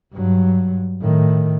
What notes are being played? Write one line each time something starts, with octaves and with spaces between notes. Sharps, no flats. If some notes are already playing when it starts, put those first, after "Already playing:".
G2 F#3
A2 D#3